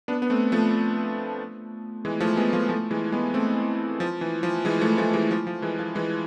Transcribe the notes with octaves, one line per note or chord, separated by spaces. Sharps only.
B3 D4
B3
A3 C4
F3 A3
E3 G#3
F3 A3
G#3 B3
F3 A3
F3 A3
E3 G#3
G#3 B3
A3 C4
F3
E3
F3
E3 G#3
F3 A3
F3 A3
E3 G#3
F3
F3
E3 G#3
F3
E3 G#3